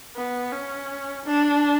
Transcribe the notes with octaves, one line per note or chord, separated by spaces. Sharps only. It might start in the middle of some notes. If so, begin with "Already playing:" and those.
B3
C#4
D4